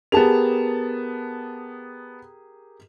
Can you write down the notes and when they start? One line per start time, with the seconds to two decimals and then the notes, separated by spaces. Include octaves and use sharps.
0.12 B3 G4 G#4 A#4 A5 F7